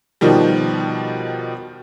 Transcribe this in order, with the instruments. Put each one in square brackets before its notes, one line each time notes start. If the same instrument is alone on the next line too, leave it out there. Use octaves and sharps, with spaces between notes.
[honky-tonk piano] B2 D#3 F3 G3